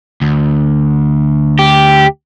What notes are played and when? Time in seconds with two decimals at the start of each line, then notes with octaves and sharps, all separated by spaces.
0.22 D2
1.59 G4